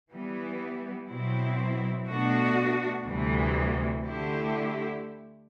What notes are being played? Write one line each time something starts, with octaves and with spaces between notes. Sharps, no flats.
E3 G3 B3
B2 F#3 C4 E4
B2 A3 D4 F#4
D2 C3 E3 G3
D3 A3 E4 G4